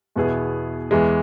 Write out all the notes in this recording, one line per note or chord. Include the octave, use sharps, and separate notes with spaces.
E2 B2 B3 E4 G#4
E2 E3 G#3